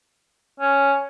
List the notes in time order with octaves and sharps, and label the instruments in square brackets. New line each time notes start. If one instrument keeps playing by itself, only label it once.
[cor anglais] C#4